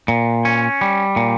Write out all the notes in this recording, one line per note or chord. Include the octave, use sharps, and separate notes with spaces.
A#2
C#4
G3
A#2